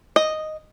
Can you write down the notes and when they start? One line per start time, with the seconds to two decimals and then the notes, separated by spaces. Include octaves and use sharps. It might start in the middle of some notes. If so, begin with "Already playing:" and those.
0.16 D#5